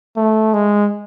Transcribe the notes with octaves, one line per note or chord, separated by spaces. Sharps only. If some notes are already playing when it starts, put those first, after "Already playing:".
A3
G#3